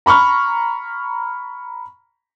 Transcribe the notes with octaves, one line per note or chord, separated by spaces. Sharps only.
A#5 B5 C#6 F6